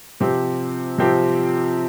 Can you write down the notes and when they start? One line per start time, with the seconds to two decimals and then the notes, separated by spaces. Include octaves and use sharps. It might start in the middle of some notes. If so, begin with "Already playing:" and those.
0.20 C3 F3 C4 G4
0.98 C3 F3 C4 G4